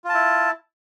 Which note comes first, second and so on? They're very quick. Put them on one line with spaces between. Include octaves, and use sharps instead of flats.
F4 A5 E4